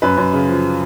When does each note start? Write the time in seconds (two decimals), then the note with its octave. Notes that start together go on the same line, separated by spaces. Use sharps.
0.02 F#2 B4
0.17 F#2
0.33 C#3
0.49 F3